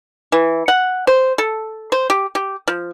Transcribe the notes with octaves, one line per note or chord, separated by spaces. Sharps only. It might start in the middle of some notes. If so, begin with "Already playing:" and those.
E3
F#5
C5
A4
C5
G4
G4
F3